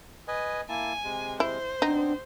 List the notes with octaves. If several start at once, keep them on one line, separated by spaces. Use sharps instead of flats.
B4 D#5 G#5
A#3 E4 G#5 A5
C3 G#3
E4 C5
B3 C4 D4 D#4